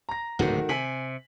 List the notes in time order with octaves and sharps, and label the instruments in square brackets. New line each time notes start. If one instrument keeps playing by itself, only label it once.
[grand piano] A#5 A#6
[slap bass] D1 G#2 C3 [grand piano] D#3 A3 F#4
[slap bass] C3 [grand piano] G#5 B6 F#7